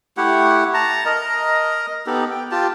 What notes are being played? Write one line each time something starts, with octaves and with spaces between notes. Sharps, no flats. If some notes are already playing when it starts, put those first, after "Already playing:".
A3 E4 G4 F#5
A5 A#5
A#4 D#5 A#5
B3 D#4 G4 A4
G5
F4 G4 A5